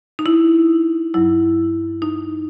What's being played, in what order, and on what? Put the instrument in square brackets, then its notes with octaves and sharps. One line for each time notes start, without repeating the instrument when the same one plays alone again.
[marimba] D#4
E4
G2 F#3 E4
D#4